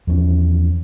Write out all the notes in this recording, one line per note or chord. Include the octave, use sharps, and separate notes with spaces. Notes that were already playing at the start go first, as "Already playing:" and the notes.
E2 F3 C4 C#4